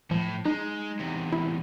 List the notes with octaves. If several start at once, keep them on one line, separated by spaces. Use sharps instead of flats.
A2 F3
G#3 D#4
E2 C3
E4